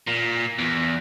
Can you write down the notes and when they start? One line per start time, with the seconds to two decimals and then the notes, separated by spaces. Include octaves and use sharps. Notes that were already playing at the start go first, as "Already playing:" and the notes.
0.08 A#2
0.58 E2